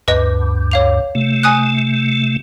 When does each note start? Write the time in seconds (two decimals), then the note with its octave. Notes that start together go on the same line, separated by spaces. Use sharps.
0.08 D2 G2 B4 D#5
0.72 C#5 F5 F7
1.15 C3 A3
1.43 G#5 D#6 F#6